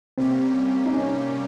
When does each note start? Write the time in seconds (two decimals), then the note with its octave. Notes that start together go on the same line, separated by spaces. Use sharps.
0.18 C3 G3 A#3 C4 C#4 G4
0.86 D#4
0.94 C#4